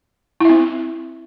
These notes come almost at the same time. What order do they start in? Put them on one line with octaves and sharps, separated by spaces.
E4 E5 C4